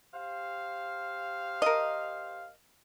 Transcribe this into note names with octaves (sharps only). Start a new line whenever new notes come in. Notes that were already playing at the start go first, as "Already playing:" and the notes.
G4 C5 F5
A#4 D#5